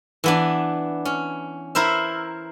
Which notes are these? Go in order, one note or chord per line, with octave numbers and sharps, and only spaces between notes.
E3 B3 D4
C#4
E4 A#4 C5 E5